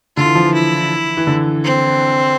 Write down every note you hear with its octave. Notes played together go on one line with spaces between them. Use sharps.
D3 F4
E3
F3
E3
E4
E3
D3
C4